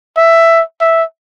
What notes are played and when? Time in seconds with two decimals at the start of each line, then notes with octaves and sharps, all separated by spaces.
0.17 E5
0.81 E5